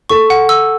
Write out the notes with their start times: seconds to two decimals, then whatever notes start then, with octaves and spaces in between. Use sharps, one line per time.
0.10 A4 C#6
0.30 F#5
0.49 E6